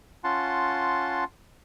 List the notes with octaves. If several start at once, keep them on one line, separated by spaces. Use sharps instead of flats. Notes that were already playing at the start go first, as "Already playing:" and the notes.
C#4 F4 F#5 A5 C6